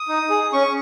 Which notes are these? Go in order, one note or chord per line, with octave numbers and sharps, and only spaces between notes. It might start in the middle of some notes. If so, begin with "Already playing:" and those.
Already playing: D#6
D#4
G#4
C#4 C#6